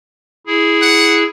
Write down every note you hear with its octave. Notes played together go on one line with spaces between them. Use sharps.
E4 G#4
F#5